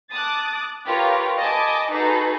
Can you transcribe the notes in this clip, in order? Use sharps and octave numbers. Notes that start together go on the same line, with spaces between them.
A5 D6 D#6 F#6 A6
F4 G4 A#4 B4 C#5
D#5 G#5 A5 B5 D6
D#4 F#4 G#4 A4 B4